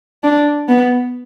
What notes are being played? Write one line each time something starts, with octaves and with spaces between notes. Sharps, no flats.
D4
B3